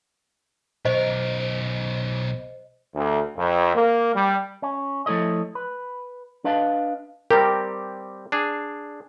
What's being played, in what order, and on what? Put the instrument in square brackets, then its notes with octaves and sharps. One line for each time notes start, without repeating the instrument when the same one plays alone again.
[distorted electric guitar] B1 A#4 [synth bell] C5 D#5
[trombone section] D2
F2
A#3
G3
[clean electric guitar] C#4
F3 A3 E4 A4 C#5 D#5
B4
D4 B4 D#5 F5 A5
[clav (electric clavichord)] G3 C4 G4 [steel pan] A#4
[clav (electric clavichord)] D4 G#4